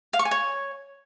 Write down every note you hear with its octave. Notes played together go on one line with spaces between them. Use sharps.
F5
C#6
G#5
C#5